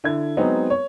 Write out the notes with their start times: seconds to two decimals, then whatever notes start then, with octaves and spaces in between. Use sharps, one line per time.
0.04 D3 E4 A4 G#6
0.37 F#3 G#3 B3 C4 D#4
0.70 C#5